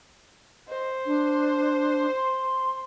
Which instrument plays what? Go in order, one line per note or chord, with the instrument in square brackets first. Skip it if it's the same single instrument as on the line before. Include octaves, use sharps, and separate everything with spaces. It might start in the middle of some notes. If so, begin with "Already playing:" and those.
[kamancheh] C5 [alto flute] D#5
[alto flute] D4
C6